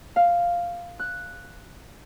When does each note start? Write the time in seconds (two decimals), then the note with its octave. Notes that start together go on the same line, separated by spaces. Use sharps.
0.16 F5
0.99 F#6